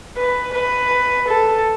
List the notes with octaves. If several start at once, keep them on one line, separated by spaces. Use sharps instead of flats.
B4
B4
A4